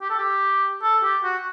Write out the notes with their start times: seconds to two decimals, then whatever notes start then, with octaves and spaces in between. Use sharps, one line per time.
0.02 G4
0.10 A4
0.19 G4
0.83 A4
1.04 G4
1.24 F#4